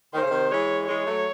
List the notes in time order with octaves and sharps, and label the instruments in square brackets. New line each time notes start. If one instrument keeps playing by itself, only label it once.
[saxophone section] D#3 [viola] C5
[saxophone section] C#3
C3 D#3
[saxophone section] E3 G#3 [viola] C#5
[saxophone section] E3 G#3 [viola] C#5
[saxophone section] F#3 A3